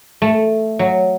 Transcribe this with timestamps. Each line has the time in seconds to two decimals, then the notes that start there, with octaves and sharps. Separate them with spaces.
0.22 A3
0.79 F#3